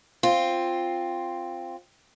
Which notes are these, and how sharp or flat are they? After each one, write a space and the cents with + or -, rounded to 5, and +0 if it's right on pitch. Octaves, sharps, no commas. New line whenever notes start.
C4 +5 F4 +0